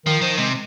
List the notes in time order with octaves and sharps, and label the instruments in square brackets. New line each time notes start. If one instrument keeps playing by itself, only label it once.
[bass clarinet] D#3 [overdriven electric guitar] F3
[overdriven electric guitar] D#3 [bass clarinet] F3
[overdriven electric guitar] C3 [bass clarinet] G#3